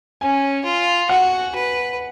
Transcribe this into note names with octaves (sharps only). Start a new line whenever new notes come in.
C#4 G#5
F4
F#4 F#5
B4